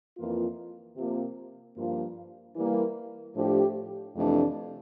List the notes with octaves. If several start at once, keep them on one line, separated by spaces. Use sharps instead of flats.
F2 E3 A#3 F4
C3 F3 A#3
G2 F3 A#3 F4
E3 G3 A#3
A2 F3 A3 D4 G4
F2 C3 E3 A3 D4